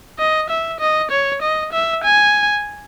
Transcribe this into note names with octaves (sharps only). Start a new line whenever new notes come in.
D#5
E5
D#5
C#5
D#5
E5
G#5